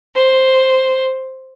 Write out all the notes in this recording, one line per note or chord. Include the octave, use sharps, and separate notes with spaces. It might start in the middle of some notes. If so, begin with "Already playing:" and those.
C5